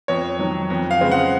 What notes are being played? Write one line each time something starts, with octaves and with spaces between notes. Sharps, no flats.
F2 C#5
D#3 F#3
F2
F5
C#3 G#3 C4
F#5